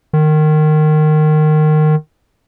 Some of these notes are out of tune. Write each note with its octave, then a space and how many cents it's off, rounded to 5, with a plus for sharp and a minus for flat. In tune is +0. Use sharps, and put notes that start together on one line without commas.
D#3 -20